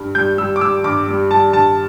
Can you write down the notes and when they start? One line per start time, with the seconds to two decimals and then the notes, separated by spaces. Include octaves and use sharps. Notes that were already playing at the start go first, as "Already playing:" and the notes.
Already playing: G2
0.15 G3 G6
0.38 G3 E6
0.56 D6
0.61 G3 E6
0.84 G2 D6
1.07 G3
1.31 G3 A5
1.53 G2 A5